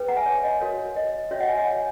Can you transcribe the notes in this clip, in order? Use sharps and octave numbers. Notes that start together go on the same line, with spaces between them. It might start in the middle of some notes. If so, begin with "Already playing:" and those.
Already playing: C#4 G#4 B4
F#5 A#5
E5 G#5
C#5
D#5
F#4 A#4 C#5
D#5
C#4 F#4 C#5 E5
D#5 F#5
E5 G#5
D#5 F#5
C#5